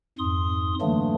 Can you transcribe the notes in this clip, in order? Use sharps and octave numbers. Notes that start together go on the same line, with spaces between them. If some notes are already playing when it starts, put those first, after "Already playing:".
F2 G#2 C6 D#6
D3 E3 F#3 A3 A#3 D4